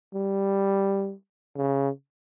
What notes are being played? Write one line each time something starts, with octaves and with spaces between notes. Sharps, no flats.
G3
C#3